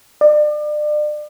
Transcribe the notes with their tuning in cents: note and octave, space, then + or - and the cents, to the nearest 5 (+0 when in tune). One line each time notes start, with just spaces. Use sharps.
D5 +35